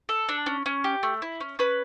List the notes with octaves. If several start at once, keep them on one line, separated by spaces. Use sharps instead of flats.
A4
D4
C#4
C#4
G4
A3
E4
C#4
C#4 B4